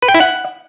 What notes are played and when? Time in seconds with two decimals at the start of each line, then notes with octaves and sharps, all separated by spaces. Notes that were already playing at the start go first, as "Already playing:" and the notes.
0.02 B4
0.08 G5
0.14 E4
0.20 F#5